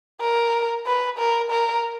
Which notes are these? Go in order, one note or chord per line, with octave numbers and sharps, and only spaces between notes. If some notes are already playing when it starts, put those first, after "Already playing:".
A#4
B4
A#4
A#4